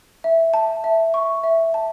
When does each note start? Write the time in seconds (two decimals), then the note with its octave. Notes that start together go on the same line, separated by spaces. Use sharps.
0.24 E5
0.54 A5
0.84 E5
1.14 C#6
1.44 E5
1.74 A5